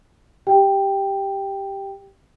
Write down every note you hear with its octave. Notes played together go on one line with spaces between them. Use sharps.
G4 G5